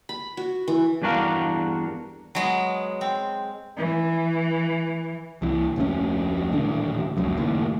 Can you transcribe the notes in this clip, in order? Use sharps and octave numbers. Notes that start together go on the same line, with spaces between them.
B5
F#4
E3
E2 G2 D4 F#4 A#4 F5
F#3 G#3 B3
C4
E3
C2 E3
F1 D2 B2 C#4
D#1 A1 D3 D4
F1 C#2 F#2
F#1 D#2 A2